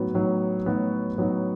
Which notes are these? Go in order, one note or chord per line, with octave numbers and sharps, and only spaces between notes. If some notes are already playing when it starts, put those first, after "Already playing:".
Already playing: A2 F#3 B3 D#4 F#4
A2 F#3 B3 D#4 F#4
A2 F#3 B3 D#4 F#4
A2 F#3 B3 D#4 F#4